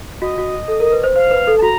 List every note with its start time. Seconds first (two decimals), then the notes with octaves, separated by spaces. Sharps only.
0.21 F#4 D#5
0.38 F#4
0.68 A4
0.80 A#4
0.92 B4
1.04 C5
1.15 C5 F5
1.31 B4
1.47 A4
1.58 A5
1.62 F#4 A#5